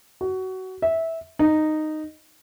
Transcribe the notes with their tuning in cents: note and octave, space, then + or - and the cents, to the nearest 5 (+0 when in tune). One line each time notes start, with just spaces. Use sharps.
F#4 +20
E5 -15
D#4 -10